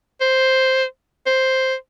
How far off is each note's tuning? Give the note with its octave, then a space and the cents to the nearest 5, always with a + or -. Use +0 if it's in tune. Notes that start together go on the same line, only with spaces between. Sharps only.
C5 +0
C5 +0